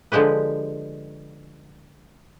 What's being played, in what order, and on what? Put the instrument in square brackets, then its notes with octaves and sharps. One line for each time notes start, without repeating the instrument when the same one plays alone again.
[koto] D3 F3 G#3 G4 B4